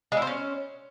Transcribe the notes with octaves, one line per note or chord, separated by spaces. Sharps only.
G#3
E4
C5
C#4